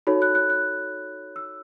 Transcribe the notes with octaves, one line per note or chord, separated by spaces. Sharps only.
D#4 F#4 A4 C#5 B5
F#6
F#6
F#6
E6